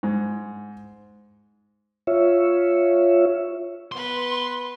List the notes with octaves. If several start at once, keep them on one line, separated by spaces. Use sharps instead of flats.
G#2
F4 C#5 E5
B3 B4 C6